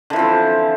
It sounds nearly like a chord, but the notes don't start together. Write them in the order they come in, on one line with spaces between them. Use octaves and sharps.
D3 E3 F3 C4